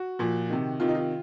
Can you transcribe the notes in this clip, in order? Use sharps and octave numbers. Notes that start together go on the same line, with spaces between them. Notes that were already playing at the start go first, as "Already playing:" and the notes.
Already playing: F#4
A#2 F3
C3 D#3
C3 D#3 F4
D#4
F4